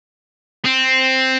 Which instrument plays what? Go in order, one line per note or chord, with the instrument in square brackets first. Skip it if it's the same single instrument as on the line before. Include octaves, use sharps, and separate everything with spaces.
[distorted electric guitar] C4